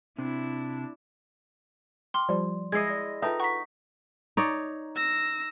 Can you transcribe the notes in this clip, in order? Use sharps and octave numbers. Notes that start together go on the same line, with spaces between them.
C3 D4 E4
G5 C6 D6 F6
F3 G3 D5
G#3 E4 D#5 G#6 C7
D5 A#6
D#4 F4 A4 B4 E5 G5 A5
F#5 A#5 C#6 B6
D#4 C#5 D5
E6 A#6